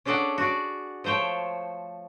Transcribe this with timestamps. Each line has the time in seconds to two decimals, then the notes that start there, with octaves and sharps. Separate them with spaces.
0.05 C#4 D4 G#4 A4 D5 F#5
0.38 F#4 G#4 D5
1.04 F3 A3 C5 C#5 G5